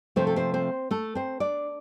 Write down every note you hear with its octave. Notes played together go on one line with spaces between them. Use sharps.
C3 F3 A3 C4 C5
A4
C4 C5
C4 C5
A3 A4
C4 C5
D4 D5